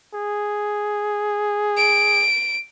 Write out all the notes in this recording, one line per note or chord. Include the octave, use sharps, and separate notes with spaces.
G#4
D7